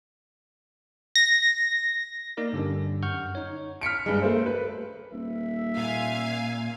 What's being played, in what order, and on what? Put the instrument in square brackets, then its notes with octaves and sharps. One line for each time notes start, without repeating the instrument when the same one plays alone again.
[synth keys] A#6
[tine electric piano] A#3 D#4 A#4 D5
G2 D3 G3 C#4 D4
F#2 F#5 C#6 F6 G6
D#4 C#5
[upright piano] F6 B6 C#7 D7
G2 G#3
A3 A#3 C5
B4
[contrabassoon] D#1 [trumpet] E5
[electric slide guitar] A#2 [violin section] F5 G#5